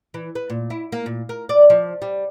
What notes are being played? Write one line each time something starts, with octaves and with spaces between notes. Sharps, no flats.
E3
B4
A#2
E4
A#3
A#2
A#4
D5
F3
G3